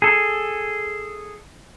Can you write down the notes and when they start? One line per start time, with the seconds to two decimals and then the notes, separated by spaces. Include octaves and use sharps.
0.02 G#4 A4